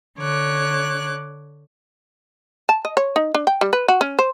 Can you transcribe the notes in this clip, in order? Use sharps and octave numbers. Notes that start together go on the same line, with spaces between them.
D3 C#5 D6 F#6
A5
D#5
C#5
D#4
D4
G5
G3
B4
F#4
C#4
C5